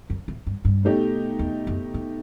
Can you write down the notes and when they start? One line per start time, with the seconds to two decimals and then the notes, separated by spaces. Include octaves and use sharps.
0.10 F#2
0.28 A2
0.47 G2
0.65 G2
0.83 B2 A3 D#4 G4
1.39 E2
1.67 F#2
1.94 A2